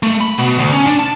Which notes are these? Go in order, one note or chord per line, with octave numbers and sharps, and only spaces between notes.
A3
B5
B2
D2
C#4
D4
A5